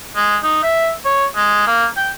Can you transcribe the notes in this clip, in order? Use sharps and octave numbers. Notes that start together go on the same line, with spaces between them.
G#3
D#4
E5
C#5
G#3
A#3
G5